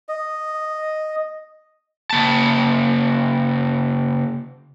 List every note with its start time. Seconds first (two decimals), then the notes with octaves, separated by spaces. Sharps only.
0.09 D#5
2.11 C#3 A#3 A5